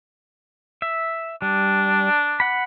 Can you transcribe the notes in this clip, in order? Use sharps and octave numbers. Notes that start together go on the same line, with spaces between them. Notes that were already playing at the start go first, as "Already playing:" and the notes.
E5
G3 D4
F#5 B5